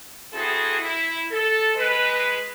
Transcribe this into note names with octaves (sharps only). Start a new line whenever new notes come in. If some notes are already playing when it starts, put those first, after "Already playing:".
C4 E4 F#4 G#4 A4
E4
A4
G#3 B4